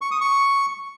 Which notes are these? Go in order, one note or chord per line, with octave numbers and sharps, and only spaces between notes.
C#6
D#6
C#6